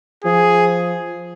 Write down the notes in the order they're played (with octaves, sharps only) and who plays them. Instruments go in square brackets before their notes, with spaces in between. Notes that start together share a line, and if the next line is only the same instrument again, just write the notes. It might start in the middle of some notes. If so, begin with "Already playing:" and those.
[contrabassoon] F3 [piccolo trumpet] G#4